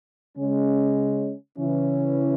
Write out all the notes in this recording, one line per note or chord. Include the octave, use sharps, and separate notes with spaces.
C#3 G#3 C#4
C#3 E3 C#4 E4